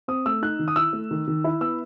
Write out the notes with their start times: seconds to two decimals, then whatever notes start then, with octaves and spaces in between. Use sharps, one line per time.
0.08 C4 D#6
0.26 A3 E6
0.42 D#4 F#6
0.59 D#3
0.68 D#6
0.76 E4 E6
0.93 A3
1.11 D#3
1.27 D#3
1.44 E4
1.61 B3 E6